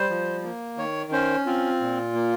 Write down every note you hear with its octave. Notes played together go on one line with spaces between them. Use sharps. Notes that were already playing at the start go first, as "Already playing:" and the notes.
Already playing: G3 C5
F3
A#3
D#3 C#5
C#4 C5
C4 F4
A#2
A#3